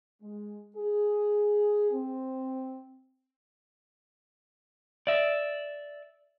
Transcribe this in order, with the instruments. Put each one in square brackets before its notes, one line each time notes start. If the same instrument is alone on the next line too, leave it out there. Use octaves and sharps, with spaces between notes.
[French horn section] G#3
G#4
C4
[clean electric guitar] D5 E5